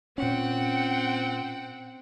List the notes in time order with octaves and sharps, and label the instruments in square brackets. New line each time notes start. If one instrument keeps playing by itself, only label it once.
[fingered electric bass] A#2 C#4 [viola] C4 [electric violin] F#5 G5